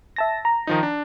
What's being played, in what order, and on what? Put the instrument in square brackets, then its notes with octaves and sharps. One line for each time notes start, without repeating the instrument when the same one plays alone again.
[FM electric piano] E5 A5 A#6
A#5
[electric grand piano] D#3 F3 D#4
D4